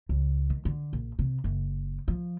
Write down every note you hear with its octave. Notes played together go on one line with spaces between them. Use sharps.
C#2
D#3
D3
A#1
C3
F#1
F3